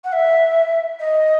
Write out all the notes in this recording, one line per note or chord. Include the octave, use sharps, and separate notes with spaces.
F#5
E5
D#5